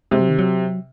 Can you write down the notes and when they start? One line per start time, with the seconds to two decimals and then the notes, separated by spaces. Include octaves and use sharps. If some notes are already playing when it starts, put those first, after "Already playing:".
0.11 C3 G#3
0.21 F#3
0.29 D#3
0.39 F#3